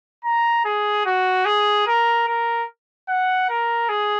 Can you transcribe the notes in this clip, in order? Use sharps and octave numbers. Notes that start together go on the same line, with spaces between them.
A#5
G#4
F#4
G#4
A#4
A#4
F#5
A#4
G#4